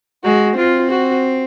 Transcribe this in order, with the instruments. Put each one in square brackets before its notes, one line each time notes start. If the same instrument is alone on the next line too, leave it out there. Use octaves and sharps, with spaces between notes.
[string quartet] G#3 [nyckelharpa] F#4
[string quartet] C4 [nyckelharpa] F4
[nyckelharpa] F#4